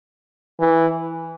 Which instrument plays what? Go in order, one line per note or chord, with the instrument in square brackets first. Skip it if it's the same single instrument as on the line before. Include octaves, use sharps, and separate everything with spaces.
[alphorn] E3